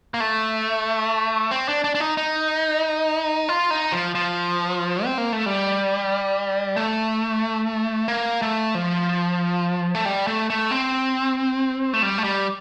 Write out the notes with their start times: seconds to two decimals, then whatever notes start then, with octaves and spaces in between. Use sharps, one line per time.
0.14 A#3
0.20 A3
1.51 C4
1.68 D4
1.84 D4
1.95 D4
2.00 D#4
2.17 D#4
3.49 F4
3.71 D#4
3.92 F3
4.15 F3
5.05 C4
5.18 A#3
5.33 A3
5.46 G3
6.77 A3
8.08 A#3
8.42 A3
8.75 F3
9.95 A3
10.05 G3
10.27 A3
10.50 A3
10.71 C4
11.93 A3
12.02 G3
12.18 A3
12.24 G3